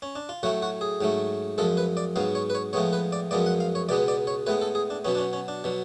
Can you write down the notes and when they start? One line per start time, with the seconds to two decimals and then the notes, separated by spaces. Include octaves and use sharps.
0.02 C#4
0.16 D4
0.29 F4
0.43 A2 F#3 A3 F#4
0.62 F#4
0.81 G#4
1.01 G#2 F#3 A3
1.58 F#2 F3 G#3 A4
1.77 B4
1.97 D5
2.16 G#2 F#3 B3 F5
2.35 C#5
2.50 B4
2.55 C#5
2.73 A2 F3 G#3 B3 C#5
2.93 B4
3.12 D5
3.31 F#2 F3 G#3 B3 D5
3.46 F#5
3.60 F5
3.75 C#5
3.89 C#2 B2 G#3 B3 D5
4.08 D5
4.27 C#5
4.46 A2 G#3 B3 B4
4.61 A4
4.75 G#4
4.90 D4
5.05 B2 F#3 B3 C#4
5.15 D4
5.18 C#4
5.33 C#4
5.48 D4
5.64 B2 F#3